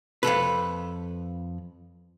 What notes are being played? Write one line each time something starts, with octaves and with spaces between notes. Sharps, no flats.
F2 C3 A4 B4